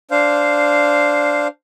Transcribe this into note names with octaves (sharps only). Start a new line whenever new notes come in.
D4 C5 F5